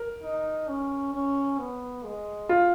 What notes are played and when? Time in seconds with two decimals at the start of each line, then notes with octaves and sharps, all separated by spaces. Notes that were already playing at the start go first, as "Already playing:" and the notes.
Already playing: A#4
0.23 D#4
0.68 C#4
1.14 C#4
1.59 B3
2.04 G#3
2.49 F4